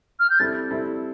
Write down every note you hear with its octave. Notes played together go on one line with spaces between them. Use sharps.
F6
G6
C3 G3 C4 E4 A4 A6
C3 G3 C4 E4 A4